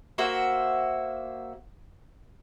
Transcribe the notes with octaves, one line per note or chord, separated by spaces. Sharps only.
A#3 F#4 C5 E5